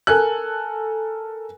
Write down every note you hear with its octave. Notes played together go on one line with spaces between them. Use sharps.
A4 A#4 G#5 F#6